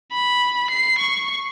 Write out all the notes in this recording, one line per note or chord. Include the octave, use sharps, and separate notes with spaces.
B5
C7
C#6